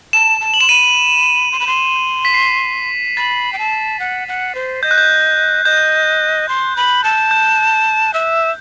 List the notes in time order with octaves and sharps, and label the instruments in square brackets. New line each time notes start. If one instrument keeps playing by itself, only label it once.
[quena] A5 [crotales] E7
[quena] A5
[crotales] F#7
[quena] C6 [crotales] E7
[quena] B5 [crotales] D#7
[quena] C6
B5
C6
[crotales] B6
C7
[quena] B5 [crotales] A6
[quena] G5
A5
F#5
F#5
C5
[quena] D#5 [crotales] G6
[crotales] F#6
G6
[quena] D#5 [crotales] G6
[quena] C6
B5
A5
[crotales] G6
[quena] E5